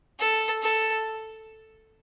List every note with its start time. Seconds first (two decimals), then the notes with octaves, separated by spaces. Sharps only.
0.20 A4
0.63 A4